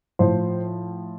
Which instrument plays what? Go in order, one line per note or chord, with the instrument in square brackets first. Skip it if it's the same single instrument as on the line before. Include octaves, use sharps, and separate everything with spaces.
[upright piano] A2 F3 C5